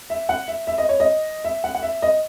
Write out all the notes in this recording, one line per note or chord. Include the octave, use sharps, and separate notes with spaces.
E5
F#5
E5
E5
D#5
C#5
D#5
E5
F#5
F#5
E5
D#5